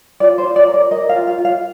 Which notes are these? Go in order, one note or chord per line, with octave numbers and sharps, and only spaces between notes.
F4 D5
C5
F4
D5
A#4
D5
A#4 D#5
F5
F4
F5
F4
F5